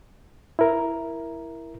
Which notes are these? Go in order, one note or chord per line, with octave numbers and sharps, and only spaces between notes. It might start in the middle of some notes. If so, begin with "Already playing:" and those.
E4 A#4